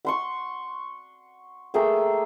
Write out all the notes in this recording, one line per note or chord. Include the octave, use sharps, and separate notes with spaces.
F#5 C6 C#6
A3 A#3 G#4 G5